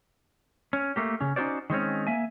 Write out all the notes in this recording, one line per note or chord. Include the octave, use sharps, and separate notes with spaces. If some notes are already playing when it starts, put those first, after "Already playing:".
C#4
A3 A#3 G4
C#3 C#4
C#4 D#4 F4 F#4 C5 D5
D#3 G#3 C4 C#4
A#3 E5 G#5